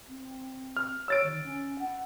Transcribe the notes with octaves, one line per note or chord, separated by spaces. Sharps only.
C4
F6
C#5 E6 A6 D7
D#3
C#4
F#5